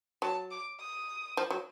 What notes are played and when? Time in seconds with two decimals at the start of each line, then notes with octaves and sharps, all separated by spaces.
0.22 F#3 A5
0.51 D6
0.80 D#6
1.37 F3
1.50 F#3